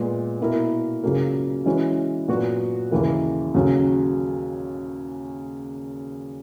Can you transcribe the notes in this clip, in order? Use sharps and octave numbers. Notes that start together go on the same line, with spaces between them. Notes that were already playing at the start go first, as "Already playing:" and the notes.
Already playing: A#2 G#3 B3
B2 A#3 E4 A#4
C#2 C#3 F#3 A#3
E3 G#3 C#4 F#4
A#2 F#3 B3 F#4
D#2 C#3 E3 A#3
D#2 C#3 F#3 C#4